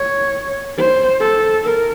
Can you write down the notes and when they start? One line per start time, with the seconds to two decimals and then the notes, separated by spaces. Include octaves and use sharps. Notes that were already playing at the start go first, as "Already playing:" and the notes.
Already playing: C#5
0.77 C5
1.20 A4
1.63 A#4